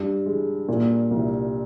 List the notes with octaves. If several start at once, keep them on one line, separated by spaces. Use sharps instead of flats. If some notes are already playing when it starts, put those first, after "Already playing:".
Already playing: G2
G#3
A#2
C2